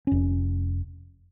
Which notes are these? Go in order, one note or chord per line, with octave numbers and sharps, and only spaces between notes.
F1 C#4